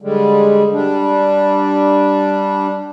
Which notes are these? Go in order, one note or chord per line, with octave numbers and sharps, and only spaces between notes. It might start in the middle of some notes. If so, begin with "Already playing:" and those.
D3 G3 G#3
G3 D4